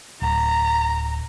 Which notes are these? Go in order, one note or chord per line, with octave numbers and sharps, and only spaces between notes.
D1 A#5